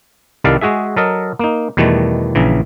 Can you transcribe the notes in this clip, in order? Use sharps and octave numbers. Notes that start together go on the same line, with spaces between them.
C2 D#3 G3 A4 D5 F5
G#3 F#4 G#4 E5
F#3 A4 A#4 D#5
A#3 D#4
E2 B2 D#3 G3 A3
A#1 C#3 E3